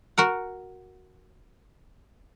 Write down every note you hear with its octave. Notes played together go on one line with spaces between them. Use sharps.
F#4 A#4 F#5